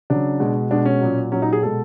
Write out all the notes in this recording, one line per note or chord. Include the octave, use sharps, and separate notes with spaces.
C#3 F#3 D4
B2 G#3
B2 G#3 D4
C#4
A#2 F#3
A#2 F#3 C#4
D#4
G#4
B2 G#3 A4